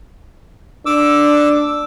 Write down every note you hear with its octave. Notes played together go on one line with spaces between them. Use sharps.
D4 D6 E6